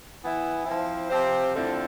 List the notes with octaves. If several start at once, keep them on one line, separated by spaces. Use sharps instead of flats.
E3 B3 E4
F3 C4 E4
C3 F3 C4 G4 C5
F2 D3 A3 C4 E4